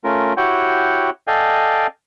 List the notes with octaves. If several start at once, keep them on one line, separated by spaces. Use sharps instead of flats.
A3 C#4 F4 A#4
E4 F#4 G4 C#5 F#5 G5
A4 D5 D#5 F5 G5 G#5